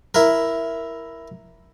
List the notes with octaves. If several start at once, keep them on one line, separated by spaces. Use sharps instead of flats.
E4 A#4